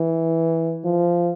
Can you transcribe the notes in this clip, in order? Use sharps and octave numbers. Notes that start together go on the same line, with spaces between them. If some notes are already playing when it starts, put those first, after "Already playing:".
Already playing: E3
F3